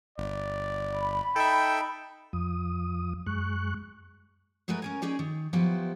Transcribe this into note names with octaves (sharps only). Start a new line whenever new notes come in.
G1 D5
B5
D#4 A4 E5 G5
F2 F3 D#6
F#2 G#3 C#6 F#6
F#3 G#3 A3 A#4 B4
C#4 A#4 G#5
A#3 C#4 D#4 G#4 D5
D#3
F3 F#3 B3 E4 G4 C5